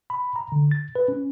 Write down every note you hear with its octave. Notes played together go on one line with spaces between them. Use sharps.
B5
A#5
D3
A6
B4
C#4